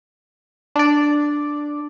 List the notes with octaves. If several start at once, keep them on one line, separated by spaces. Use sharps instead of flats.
D4 D5